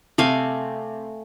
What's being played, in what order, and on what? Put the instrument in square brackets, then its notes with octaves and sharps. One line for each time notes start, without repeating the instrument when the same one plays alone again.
[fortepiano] C3 [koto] A3 F5 G#5